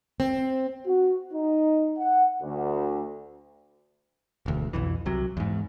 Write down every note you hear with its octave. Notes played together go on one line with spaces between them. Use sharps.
C4
F#4
D#4
F#5
D2
E1 D2
B1 F2 E3
C2 C3 F#3
E2 G#2